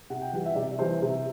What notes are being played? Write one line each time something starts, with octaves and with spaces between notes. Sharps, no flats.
C3 F#5
G5
E3 G3 F#5
E5
C3 D5
E3 G3 C5
C3